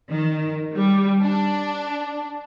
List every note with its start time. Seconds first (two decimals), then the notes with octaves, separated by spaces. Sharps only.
0.10 D#3
0.76 G3
1.22 D4